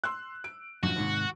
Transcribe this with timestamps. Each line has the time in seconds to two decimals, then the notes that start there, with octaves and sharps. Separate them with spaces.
0.04 C6 E6 F#6
0.44 D7
0.83 A#1 F#2 A2 E3 F#4
0.96 D#2 G#2 C3 D#3